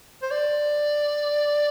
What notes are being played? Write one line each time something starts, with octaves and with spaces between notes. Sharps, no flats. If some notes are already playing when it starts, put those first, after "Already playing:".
C5
D5